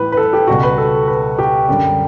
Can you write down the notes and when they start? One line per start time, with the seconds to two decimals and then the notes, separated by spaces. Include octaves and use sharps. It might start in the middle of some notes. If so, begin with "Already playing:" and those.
Already playing: A2 E3 G3 B4
0.12 B4
0.17 A4
0.33 G4
0.47 C#2 B2 G3 F#4
0.63 B4
0.78 A4
1.08 B4
1.39 G4
1.68 F#2 D3 G3